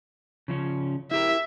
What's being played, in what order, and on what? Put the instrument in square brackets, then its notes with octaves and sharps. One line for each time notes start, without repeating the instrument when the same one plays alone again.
[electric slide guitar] C#3 F3 C#4
[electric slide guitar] E4 G4 A#4 [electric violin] E5